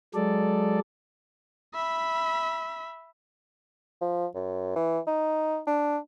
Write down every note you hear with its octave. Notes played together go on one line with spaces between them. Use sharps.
F#3 G#3 A4 D5
E5 B5
F3
F#2
E3
D#4
D4